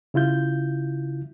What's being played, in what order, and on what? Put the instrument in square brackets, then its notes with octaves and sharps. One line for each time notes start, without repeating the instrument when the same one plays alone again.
[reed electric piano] C#3 E4 F4 G6